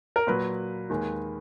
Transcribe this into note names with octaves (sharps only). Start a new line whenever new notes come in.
A#4
A#2 F#3 B4
D#2 D#3 G#3